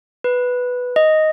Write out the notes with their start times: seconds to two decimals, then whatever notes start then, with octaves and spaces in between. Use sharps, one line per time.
0.24 B4
0.96 D#5